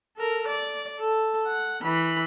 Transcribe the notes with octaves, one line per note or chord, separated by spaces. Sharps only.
A4 A#4
D5
A4
F#5
E3 B5